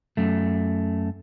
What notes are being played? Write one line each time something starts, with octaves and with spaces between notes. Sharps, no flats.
F#2 A3